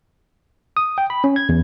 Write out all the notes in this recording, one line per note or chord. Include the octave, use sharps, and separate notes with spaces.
D#6
G5
B5
C#4
G#6
E2